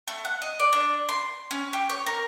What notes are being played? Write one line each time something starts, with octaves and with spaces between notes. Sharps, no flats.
A3
F#5
D#5
D5
D4
C6
C#4
G4
C#5
A#4